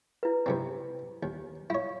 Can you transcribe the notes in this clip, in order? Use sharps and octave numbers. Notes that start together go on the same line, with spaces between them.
E4 B4
G2 C3 C4
D#2
E4 C#5 F5